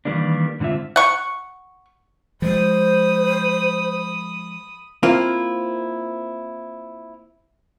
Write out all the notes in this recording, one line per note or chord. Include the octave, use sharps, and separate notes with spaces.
D#3 E3 G3 A#3 D4
G#2 D3 C4 F4 E5
F#5 C#6
F3 G#3 C5 B5 D#6
A#3 C4 E4 F4